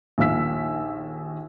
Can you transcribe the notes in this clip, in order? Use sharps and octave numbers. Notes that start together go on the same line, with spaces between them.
A#1 D#2 A#3 F5 E6 B6